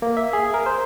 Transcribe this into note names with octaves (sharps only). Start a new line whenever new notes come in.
A#3
E5
G#4
A#4
C5